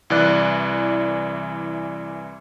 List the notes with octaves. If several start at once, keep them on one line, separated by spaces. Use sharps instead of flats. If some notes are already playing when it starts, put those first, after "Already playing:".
C2 E3 D5 F#6